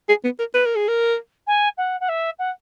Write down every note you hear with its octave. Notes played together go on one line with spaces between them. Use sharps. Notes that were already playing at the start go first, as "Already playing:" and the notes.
G#4
B3
A#4
B4
A#4
G#4
A#4
G#5
F#5
F#5
E5
F#5